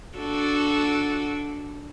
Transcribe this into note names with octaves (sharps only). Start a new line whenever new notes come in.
D4 F#4 A4